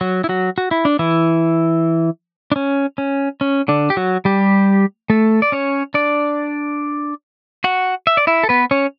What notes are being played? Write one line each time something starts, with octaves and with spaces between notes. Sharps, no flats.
F#3 F#4
E4
F#3 F#4
F#4
E4
D4
E3 E4
D4
C#4
C#4
C#4
D3 D4
G4
F#3 F#4
G3 G4
A3 A4
D5
C#4 C#5
D4 D5
F#4 F#5
E5
D5
E4 E5
A4
B3 B4
C#4 C#5